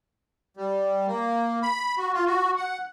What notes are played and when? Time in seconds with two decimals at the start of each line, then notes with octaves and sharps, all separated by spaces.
0.57 G3
1.07 A#3
1.63 B5
1.98 F#4
2.14 F4
2.26 F#4
2.57 F#5